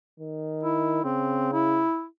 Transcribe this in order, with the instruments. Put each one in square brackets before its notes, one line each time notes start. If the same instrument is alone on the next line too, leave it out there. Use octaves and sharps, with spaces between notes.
[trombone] D#3
[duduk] E4
[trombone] C#3 [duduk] C4
[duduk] E4